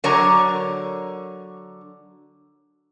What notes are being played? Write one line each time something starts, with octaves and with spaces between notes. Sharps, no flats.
D3 F#3 A#4 C#5 D5 A#5